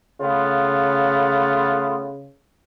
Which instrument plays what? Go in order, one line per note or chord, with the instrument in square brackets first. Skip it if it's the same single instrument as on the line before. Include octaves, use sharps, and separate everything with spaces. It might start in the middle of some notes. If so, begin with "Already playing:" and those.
[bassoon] C#3 [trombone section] A3 B3 F4